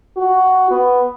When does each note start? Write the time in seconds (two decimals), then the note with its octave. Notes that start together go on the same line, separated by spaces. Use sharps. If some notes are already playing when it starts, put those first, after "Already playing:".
0.17 F#4
0.71 B3